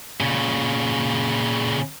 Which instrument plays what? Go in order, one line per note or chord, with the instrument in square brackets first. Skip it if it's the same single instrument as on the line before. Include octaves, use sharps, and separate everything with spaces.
[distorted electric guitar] A#2 C#3